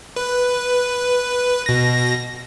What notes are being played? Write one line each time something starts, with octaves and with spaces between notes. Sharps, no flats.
B4
B2 A#6